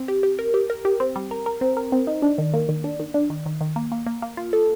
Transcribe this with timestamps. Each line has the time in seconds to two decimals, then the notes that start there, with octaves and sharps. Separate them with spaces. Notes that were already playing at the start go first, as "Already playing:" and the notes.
Already playing: C4
0.08 G4
0.23 G4
0.39 A#4
0.54 G4
0.70 A#4
0.85 G4
1.00 C4
1.16 G3
1.31 A#4
1.46 A#4
1.61 C4
1.77 A#4
1.92 C4
2.07 D#4
2.22 D4
2.38 D#3
2.54 A#3
2.69 D#3
2.84 D4
3.00 D#3
3.14 D4
3.30 D#3
3.46 D#3
3.61 D#3
3.76 A#3
3.92 A#3
4.06 A#3
4.22 A#3
4.37 F4
4.53 A4